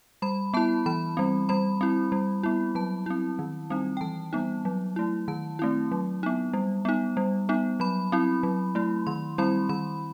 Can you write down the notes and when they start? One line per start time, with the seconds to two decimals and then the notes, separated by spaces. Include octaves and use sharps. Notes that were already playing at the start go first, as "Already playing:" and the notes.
0.22 G3 B5
0.54 B3 E4 A5
0.86 E3 B5
1.17 G3 C4
1.49 G3 B5
1.81 C4 E4
2.12 G3
2.43 B3 E4
2.75 F#3 A5
3.06 C4 E4
3.39 D#3
3.70 G3 C4 D#4
3.97 G5
4.01 E3 A5
4.33 G3 B3 D#4
4.65 F#3
4.96 A3 E4
5.28 D#3 A5
5.59 A3 C4 E4
5.92 F#3
6.23 B3 D#4
6.54 G3
6.85 B3 D#4
7.17 G3
7.49 B3 D#4
7.80 F#3 B5
8.12 C4 E4
8.43 F#3
8.75 A3 E4
9.07 D#3 C6
9.38 G3 C4 E4 B5
9.69 D#3 B5